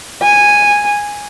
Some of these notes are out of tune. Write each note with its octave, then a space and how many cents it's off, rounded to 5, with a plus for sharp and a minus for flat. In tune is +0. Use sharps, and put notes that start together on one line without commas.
G#5 -10